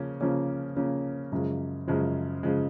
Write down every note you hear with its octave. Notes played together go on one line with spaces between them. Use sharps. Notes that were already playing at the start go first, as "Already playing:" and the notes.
Already playing: C#3 F3 A#3 C#4
C#3 F3 A#3 C#4
C#3 F3 A#3 C#4
F#2 C#3 F3 G#3
F#2 C#3 F3 G#3
C#3 F3 G#3